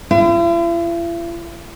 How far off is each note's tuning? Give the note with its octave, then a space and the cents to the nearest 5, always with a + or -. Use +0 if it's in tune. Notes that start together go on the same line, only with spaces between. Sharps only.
E4 +45